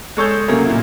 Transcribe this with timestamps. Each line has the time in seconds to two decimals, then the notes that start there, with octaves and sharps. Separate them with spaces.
0.17 G#3 A4 C#5 A5 E6 G6
0.48 C3 F#3 A3 A#3 C#4
0.65 A#2 E4